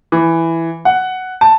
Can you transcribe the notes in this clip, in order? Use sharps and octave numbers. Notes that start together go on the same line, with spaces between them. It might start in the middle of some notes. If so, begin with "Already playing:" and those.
E3
F#5
A5